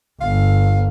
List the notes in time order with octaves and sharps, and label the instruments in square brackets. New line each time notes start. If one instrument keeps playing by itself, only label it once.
[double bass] G1 [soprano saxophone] F5